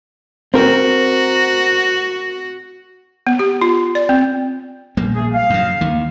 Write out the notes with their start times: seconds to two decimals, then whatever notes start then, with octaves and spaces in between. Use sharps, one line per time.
0.54 C4 F#4 A#4
3.27 B3
3.39 G4
3.61 F4
3.95 D5
4.09 C4
4.97 A#1 G3 A#3
5.16 A3 G#4
5.34 F5
5.50 F#2 C#3
5.81 D#2 D#3